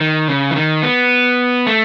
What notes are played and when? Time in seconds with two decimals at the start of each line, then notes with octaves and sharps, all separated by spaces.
0.01 D#3
0.28 C#3
0.51 E3
0.56 D#3
0.83 B3
1.67 A3